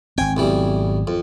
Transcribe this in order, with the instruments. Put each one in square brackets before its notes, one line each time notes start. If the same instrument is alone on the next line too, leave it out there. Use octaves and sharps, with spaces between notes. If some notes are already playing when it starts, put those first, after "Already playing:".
[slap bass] G#1 C4 [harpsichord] G5 G#5
[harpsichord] B1 E3 G3
F2